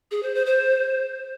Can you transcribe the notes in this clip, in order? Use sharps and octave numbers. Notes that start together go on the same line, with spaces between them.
G#4
C5
C5
C5